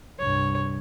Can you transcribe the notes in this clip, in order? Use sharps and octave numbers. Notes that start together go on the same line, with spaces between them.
C2 G2 C#5